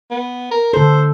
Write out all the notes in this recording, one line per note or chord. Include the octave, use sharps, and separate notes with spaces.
B3
A#4
D3 A4 C5